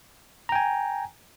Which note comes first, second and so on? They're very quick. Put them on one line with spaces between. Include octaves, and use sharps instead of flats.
A#5 G5 G#5